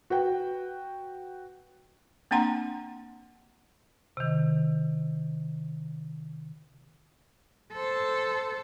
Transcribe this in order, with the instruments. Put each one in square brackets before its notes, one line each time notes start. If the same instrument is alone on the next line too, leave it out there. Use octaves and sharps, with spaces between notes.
[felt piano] F#4 B4 G5
[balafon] A#3 C4 D4 F#5 A#5 C6
[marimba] C3 D#3
[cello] A4 C5